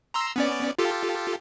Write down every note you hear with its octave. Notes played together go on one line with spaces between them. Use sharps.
A#5 C6 E6
B3 C#4 D5
F4 G4 A4